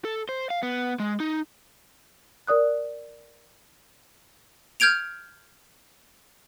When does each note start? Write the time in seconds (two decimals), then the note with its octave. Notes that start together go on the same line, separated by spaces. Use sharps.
0.05 A4
0.29 C5
0.50 F5
0.63 B3
1.00 G#3
1.20 D#4
2.47 A#4 D5 D#6 F#6
4.80 F6 G6 G#6 D7 F7